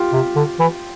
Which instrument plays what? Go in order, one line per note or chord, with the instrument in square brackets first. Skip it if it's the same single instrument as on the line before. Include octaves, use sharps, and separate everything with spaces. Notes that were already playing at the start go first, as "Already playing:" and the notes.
Already playing: [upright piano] F4 G4
[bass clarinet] C3
D3
E3